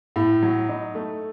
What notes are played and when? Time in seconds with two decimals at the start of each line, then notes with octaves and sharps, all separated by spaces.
0.16 A2
0.42 F#3
0.69 D#4
0.95 A3